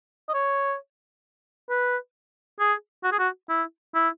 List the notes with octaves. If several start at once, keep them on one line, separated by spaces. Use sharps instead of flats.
D#5
C#5
B4
G#4
F#4
G#4
F#4
E4
E4